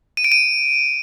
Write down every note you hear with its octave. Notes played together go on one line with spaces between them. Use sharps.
D#7
D7
D#7